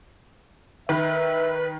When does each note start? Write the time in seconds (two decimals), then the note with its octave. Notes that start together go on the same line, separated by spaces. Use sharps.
0.89 D#3 B4 E5